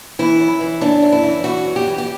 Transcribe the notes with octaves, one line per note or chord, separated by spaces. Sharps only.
E3 E4
F#2
E3
F#2 D4
F#2
E4
E3
E3 F#4
F#2
G4
E3
G4